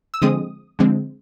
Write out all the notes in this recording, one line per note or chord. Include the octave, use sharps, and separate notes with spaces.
E6
D3 F3 G#3 C4 D#6
D3 F3 G#3 C4